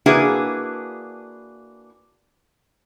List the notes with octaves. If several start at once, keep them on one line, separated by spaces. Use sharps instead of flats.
A#3 D4 E4 F#4 G#4 B4